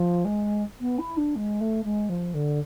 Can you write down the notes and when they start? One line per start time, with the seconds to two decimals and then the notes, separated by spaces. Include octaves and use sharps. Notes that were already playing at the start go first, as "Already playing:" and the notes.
Already playing: F3
0.24 G#3
0.80 B3
0.98 E4
1.16 D4
1.35 G#3
1.60 A3
1.84 G#3
2.09 F3
2.34 D3